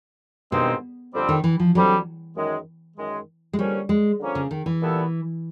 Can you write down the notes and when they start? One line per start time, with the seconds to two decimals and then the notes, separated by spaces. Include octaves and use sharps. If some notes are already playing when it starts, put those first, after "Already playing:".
0.52 G2 B2 D#3 G#3 C4 D#4
1.14 F2 D3 G3 C4
1.29 D#3
1.44 E3
1.60 F3
1.75 F2 D3 F#3 G3 C4
2.36 F#2 D#3 G#3
2.97 F#2 D#3 G#3
3.53 G#3
3.59 D3 F3 G3 A#3 C#4
3.89 G#3
4.20 D3 F3 A#3 C#4
4.35 C#3
4.51 D#3
4.66 E3
4.81 A#2 G3 B3 E4 A4